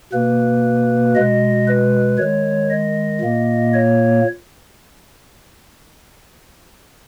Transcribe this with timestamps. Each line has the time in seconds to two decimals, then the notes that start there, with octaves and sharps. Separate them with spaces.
0.13 B2 A#3 B4
1.15 B2 G#3 D#5
1.68 B4
2.18 D#3 G#3 C#5
2.70 D#5
3.21 A#2 A#3
3.73 C#5